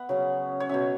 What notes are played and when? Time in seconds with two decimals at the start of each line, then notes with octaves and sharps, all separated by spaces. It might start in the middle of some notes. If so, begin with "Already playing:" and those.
Already playing: B3 E5 F#5
0.09 C#3 F#3 C#4
0.60 C#5
0.69 B2 F#3 C#4 E5